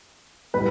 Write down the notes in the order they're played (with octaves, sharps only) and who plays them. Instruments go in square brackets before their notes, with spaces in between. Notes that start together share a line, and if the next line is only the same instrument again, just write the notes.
[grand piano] A2 G3 B4